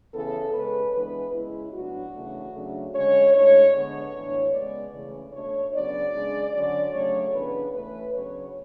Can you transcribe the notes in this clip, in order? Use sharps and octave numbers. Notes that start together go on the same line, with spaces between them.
C#3 E3 B3 A4
C#3 G#3 C#4 B4
E3 G#3 B3 D4 B4
C#3 G#3 C#4 E4
A2 F#3 B3 D4 F#4
C#3 E3 A3 D4
C#3 F#3 A3 D4
D3 G#3 C#4 C#5
A2 G#3 D4 C#5
D3 G#3 B3 C#5
A2 E3 B3 D4
C#3 G#3 B3 D5
C#3 E3 A3
B2 A3 D4 C#5
C#3 F#3 B3 D4 D5
C#3 G#3 D4
D3 F#3 C#4 D5
C#3 F#3 A3 D4 C#5
C#3 E3 B3 D4 B4
E3 A3 C#4 B4
C#3 F#3 B3 D4 C#5